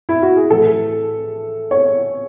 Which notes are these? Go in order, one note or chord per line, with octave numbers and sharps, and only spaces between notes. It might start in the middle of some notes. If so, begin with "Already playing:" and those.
E4
F#4
G#4
A2 E3 A4
C#5